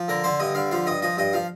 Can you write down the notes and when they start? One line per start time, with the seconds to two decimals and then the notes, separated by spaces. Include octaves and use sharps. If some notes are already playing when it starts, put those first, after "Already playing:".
Already playing: F3
0.08 D3 A#4
0.24 D3 C5
0.40 G2 D#5
0.55 D3 F5
0.71 F3 F5
0.86 G2 D#5
1.02 F3 D#5
1.17 G2 D#5
1.33 F3 F5